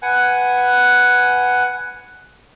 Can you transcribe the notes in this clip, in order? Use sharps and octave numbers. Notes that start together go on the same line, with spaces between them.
B4 F#5 G#5